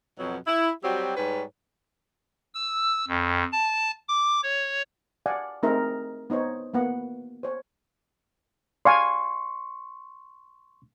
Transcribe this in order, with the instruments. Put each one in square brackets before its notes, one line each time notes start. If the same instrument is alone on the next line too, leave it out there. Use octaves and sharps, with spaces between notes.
[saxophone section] F2 B2 F#3
E4
F#3 G3 C4 F#4 G4
G#2 G3 B4 C#5
[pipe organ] E6
F2
A5
D6
C#5
[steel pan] D5 F5 F#5 G#5
A3 C4 D#4 G#4 A#4 E5
B3 D#4 C5 C#5
A#3 B3 F#5
C5 C#5
[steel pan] D5 F5 G#5 [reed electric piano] C6 C#6